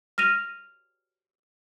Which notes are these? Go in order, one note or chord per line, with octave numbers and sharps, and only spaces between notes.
F6 A#6 D#7 F7